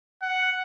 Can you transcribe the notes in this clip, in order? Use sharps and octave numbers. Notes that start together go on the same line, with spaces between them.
F#5